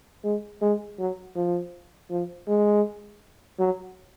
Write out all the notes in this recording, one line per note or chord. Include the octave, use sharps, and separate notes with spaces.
G#3
G#3
F#3
F3
F3
G#3
F#3